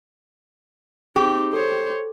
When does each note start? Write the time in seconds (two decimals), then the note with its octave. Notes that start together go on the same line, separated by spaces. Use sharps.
1.16 C4 D#4 G4 G#4
1.53 A4 C5 C#5